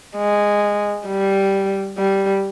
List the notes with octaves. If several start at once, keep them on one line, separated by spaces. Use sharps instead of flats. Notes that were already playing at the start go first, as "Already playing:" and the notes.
G#3
G3
G3